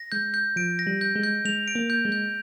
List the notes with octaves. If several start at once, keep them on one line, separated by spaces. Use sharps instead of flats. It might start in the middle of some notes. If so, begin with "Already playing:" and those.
Already playing: A#6
G#3 G6
G6
F3 D7
A#6
G3
G6
G#3
G6
G#3 F7
D7
A#3
G6
G#3
G6